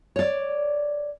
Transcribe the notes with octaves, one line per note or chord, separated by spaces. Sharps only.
C#5 D5